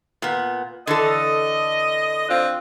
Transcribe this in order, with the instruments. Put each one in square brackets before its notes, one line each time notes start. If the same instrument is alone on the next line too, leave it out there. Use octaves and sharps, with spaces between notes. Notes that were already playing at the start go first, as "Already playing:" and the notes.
[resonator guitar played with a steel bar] A#2 B3
[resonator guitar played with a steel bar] D3 E3 A4 [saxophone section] D#5
[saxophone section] C4 D4 F4